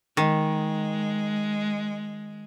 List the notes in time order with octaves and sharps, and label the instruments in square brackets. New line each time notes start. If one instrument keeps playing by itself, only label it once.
[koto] D#3 [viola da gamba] G#3